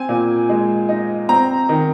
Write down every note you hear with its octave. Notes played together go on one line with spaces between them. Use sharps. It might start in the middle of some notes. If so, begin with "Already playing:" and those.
Already playing: C4 G#5
A#2
G#3
D#4
C4 A#5
D#3